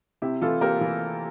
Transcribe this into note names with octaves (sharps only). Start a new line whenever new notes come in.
C3 E4 G4
E3 F4 A4
A#3 G4 A#4
E3